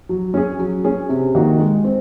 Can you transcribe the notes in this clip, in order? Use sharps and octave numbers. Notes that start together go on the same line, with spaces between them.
F#3
C#4 G#4
F#3
C#4 G#4
C3
D#3 A#3 D#4 F#4
G#3
C4